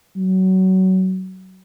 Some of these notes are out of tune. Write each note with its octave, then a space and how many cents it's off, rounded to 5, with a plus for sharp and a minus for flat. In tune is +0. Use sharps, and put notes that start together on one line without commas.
F#3 +20